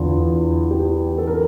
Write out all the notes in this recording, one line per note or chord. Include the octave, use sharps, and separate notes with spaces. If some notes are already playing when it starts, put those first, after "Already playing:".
Already playing: E2 D3 F4
G4
A4
A#4